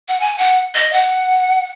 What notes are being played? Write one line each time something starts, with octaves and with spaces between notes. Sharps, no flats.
F#5
G#5
F#5
D#5
F#5